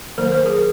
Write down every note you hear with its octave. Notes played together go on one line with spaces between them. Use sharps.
D#3 F#3 A#3 A#4 C5
A#4 C5
G#4 A#4